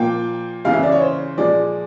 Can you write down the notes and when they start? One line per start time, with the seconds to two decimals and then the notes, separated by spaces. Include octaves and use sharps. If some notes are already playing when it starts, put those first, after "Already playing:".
Already playing: A#2 F3 A#3 G5
0.65 C#3 E3 G#3 F5
0.73 E5
0.83 D5
0.92 C#5
1.02 C5
1.37 A#2 F3 G#3 D5